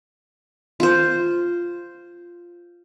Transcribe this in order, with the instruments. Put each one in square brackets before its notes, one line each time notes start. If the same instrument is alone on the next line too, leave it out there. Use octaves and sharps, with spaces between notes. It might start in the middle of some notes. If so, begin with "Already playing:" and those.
[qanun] F4 C5